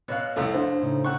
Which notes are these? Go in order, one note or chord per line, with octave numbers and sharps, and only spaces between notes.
B2 C#5 F5 F#6
C2 F2 A3 D6
F2 D4 C5
A2 C#3 D#4
D3 F#5 G5 C#6 F#6